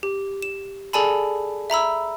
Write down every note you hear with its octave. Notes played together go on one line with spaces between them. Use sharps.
G4
E7
G#4 A4 D5 G#5 A5 B5
E5 A#5 B5 E6